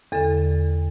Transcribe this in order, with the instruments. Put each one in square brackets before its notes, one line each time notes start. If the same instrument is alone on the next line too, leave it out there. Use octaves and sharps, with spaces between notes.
[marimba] E2 D3 A4